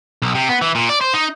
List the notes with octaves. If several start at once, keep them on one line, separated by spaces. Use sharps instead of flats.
B1
C3
B3
E3
A#2
D5
C5
D#4